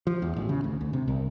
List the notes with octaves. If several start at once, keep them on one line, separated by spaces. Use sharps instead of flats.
F3
E2
A1
C#3
D2
D2
C3
C2